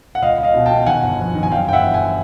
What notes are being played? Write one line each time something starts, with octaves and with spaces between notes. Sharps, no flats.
F#5
C#2 D#5 F5
C#2
D#5 F5
B2
G5 A5
B2
D#3 F#5 G#5
G1
F2
D#3
G#5
F#2 F5 G5
G1 G5
E5 F#5
E3
F#5 G#5